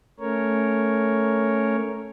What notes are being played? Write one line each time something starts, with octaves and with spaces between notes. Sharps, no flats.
A3 C#4 A#4 C#5